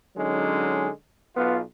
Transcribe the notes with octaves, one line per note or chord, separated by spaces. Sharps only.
D3 F#3 G#3 C#4 D#4
B1 B3 F4